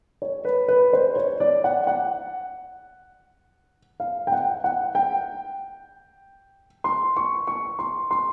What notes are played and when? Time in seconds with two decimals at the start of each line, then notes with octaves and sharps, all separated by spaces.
0.22 C#5
0.45 B4
0.68 B4
0.93 C5
1.16 C#5
1.40 D5
1.64 F#5
1.87 F#5
4.00 F5
4.27 G5
4.32 F#5
4.64 F#5
4.95 G5
6.84 C6
7.17 C#6
7.47 C#6
7.79 C6
8.11 C6